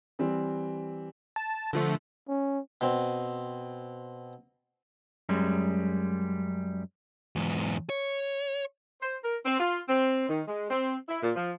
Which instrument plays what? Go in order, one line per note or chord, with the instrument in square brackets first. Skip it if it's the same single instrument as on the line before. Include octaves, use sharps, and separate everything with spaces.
[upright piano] E3 G3 C4
[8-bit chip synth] A5
D3 F3 A3
[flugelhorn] C#4
[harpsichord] B2 C4
[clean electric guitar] F#2 G3 G#3
[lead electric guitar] E2 G#2
C#5
[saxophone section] C5
A#4
C4
F4
C4
D#3
G#3
C4
E4
A#2
F3